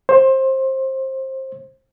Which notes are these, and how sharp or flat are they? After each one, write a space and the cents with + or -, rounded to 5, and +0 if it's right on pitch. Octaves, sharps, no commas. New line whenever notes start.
C5 +20